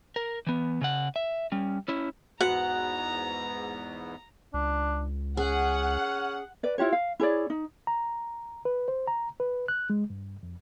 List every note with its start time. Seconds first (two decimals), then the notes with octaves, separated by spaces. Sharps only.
0.16 A#4
0.47 E3 B3
0.81 C#3 F#5
1.16 E5
1.52 G3 C#4
1.88 C#4 E4
2.41 E2 G#2 B3 F#4 F#5 A#5
4.54 C#2 D4
5.37 C#4 G#4 F#5
6.63 B4 D5
6.78 E4 F4 G4 C#5
6.92 F5
7.20 E4 G#4 C#5 D5
7.50 D#4
7.87 A#5
8.65 B4
8.88 C5
9.07 A#5
9.40 B4
9.68 F#6
9.90 G#3
10.10 G2
10.43 F2